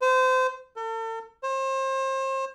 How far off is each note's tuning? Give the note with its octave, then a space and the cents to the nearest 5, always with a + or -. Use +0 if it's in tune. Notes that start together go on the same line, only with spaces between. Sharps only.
C5 -25
A4 +40
C5 +35